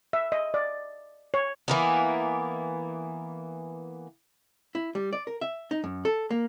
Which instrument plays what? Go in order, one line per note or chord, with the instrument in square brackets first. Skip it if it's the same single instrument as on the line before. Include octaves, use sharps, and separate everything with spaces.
[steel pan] E5
D#5
D5
C#5
[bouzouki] E3 A#3 B3
[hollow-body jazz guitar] E4
G3
D5
A#4
E5
D#4
F#2
A4
A#3